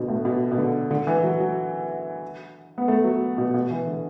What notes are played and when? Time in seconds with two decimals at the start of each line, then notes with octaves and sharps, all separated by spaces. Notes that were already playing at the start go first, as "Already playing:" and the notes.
Already playing: B2 D3
0.08 A2
0.25 B2
0.51 B2
0.58 D3
0.91 D3
1.07 E3
1.23 F#3
1.40 F#3
2.78 B3
2.88 A3
3.04 F#3
3.38 B2
3.54 B2
3.71 E3
3.87 D3